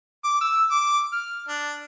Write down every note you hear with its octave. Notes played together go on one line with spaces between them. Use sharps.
D6
E6
D6
F6
D4